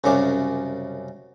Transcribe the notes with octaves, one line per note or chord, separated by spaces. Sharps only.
C2 F#2 C#3 D6